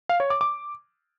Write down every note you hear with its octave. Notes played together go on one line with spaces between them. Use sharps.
F5
C#5
D6
D6